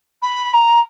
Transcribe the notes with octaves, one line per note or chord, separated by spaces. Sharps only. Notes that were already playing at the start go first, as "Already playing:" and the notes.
B5
A#5